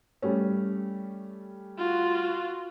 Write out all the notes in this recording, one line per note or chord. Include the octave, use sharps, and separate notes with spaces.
G3 A3 C#4
F4 F#4